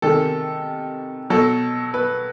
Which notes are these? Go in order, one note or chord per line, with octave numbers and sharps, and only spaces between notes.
C3 D#3 G#3 A4
B2 F#3 A4
B4